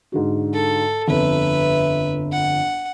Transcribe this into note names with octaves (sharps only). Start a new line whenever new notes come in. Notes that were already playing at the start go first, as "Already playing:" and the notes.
G#2 D3 F#4
A4
G1 F2 B4 E5
F#5